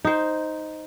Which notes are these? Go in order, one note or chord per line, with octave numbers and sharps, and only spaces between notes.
D#4 C5